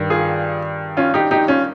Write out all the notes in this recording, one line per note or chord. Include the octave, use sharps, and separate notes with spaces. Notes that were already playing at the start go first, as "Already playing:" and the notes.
Already playing: G2 D#3
F4 G#4
C#4 F4
D#4 G4
D#4 G4
C#4 F4